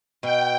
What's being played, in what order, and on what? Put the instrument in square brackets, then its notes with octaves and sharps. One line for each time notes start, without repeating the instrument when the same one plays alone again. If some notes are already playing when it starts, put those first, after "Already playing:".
[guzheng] B2 [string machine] G5